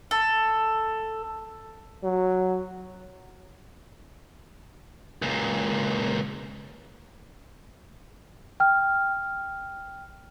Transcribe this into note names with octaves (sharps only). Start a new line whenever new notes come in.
A4
F#3
C#2 A#2
G5 F6